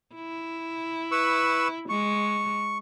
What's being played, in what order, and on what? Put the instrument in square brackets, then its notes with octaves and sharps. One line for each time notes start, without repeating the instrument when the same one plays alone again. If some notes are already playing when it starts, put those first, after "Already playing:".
[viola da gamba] E4
[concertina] B4 C#6 E6
[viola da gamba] G#3 [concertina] C#6